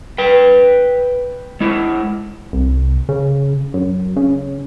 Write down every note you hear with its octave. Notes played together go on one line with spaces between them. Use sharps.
B4 G5
G#3 E4
C2
C#3
F#2
C#3